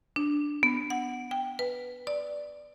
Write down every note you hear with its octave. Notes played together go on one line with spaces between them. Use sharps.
D4
B3
F#5
G5
B4
D5